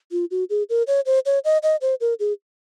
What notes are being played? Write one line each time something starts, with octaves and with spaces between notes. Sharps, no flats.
F4
F#4
G#4
A#4
C#5
C5
C#5
D#5
D#5
C5
A#4
G#4